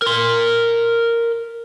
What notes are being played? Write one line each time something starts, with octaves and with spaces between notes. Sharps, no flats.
A#4 C6